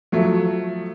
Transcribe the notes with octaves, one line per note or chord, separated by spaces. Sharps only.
F3 F#3 A3